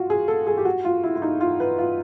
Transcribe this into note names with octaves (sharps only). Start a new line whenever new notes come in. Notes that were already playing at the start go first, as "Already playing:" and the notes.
Already playing: F4 F#4
G#4
A4
G#4
G4
F#4
F4
E4
E4
D#4
F4
B4
F4